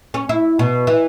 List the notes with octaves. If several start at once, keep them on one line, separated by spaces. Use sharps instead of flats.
C#4
E4
B2
E3